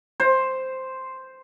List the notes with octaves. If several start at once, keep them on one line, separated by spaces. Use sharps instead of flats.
C5